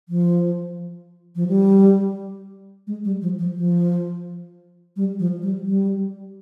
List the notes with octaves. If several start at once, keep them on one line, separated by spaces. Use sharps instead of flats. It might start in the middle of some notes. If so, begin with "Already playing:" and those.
F3
F3
G3
G#3
G3
F3
F3
F3
G3
F3
G3
G3